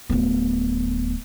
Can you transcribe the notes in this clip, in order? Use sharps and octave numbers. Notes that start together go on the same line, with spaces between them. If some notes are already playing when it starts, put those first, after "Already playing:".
D1 B3